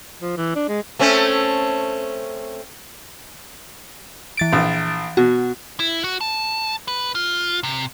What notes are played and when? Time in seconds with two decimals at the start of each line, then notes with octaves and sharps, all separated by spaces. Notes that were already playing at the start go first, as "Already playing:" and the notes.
0.22 F3
0.37 E3
0.56 D4
0.69 G#3
0.99 A3 C4 C#4
4.37 E3 A6 D7
4.53 A#1
5.17 B2 F#4
5.80 E4
6.04 F#4
6.21 A5
6.88 B4
7.15 F4
7.63 C3